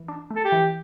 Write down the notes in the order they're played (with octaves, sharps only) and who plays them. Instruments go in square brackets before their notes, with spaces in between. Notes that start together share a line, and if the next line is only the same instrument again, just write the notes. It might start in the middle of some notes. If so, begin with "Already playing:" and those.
Already playing: [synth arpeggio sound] E3
D4
A3
[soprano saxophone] A4
G4
[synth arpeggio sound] E3